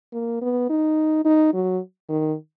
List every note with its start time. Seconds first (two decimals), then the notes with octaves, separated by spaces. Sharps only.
0.13 A#3
0.42 B3
0.70 D#4
1.25 D#4
1.54 F#3
2.09 D#3